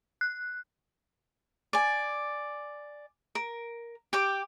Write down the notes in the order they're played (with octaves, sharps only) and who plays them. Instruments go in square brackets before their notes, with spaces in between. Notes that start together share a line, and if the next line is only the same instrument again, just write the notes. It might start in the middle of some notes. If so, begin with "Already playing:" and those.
[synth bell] F#6
[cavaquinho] D5 G#5
A#4
G4 G5 D6